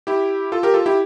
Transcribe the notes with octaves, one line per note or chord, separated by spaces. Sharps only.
E4 G4
F4 A4
G4 A#4
F4 A4
E4 G4